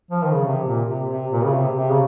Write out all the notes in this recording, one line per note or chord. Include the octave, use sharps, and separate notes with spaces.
F3
D#3
C#3
C3
A#2
C3
C3
A#2
C#3
C3
C3
C#3